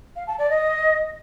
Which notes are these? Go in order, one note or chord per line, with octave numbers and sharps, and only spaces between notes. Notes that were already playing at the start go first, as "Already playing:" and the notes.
F5
A5
D5
D#5